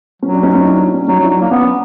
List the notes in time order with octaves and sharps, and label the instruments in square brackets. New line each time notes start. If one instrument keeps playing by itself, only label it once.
[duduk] F#3 [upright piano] C#4
[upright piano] D4
C#4 D#4
C#4 D#4
D4 E4
D4
C#4
[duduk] F#3 [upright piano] C#4 D#4
[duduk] F#3
[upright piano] D4 E4
[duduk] F#3
[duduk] A#3 [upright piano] D4
[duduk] B3 [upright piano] C#4